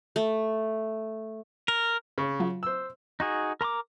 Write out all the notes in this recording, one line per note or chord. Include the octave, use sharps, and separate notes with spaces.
A3
A#4
C#3
F#3 F4
C5 E6
D#4 F#4 G#4
A#4 A#5 C6 D6